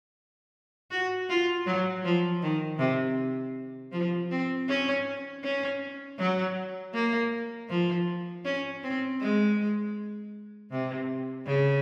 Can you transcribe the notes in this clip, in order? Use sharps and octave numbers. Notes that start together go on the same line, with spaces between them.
F#4
F4
F#3
F3
D#3
C3
F3
C4
C#4
C#4
F#3
A#3
F3
C#4
C4
G#3
C3
C#3